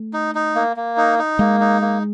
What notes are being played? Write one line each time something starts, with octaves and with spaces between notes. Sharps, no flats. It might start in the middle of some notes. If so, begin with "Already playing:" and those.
Already playing: A3
D#4
D#4
A#3
A#3
D#4
D#4
G#3 A#3
D#4
A#3